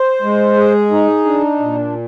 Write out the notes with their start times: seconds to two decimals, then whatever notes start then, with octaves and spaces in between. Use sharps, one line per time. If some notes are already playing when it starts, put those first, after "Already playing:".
Already playing: C5
0.22 G#3
0.57 G#4
0.91 D#4
1.25 D4
1.60 A#2